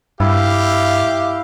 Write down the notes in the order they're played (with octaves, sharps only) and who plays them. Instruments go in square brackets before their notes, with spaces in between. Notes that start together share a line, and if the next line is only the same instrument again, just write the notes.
[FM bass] G2 [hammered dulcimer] E4 [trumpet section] G4 F5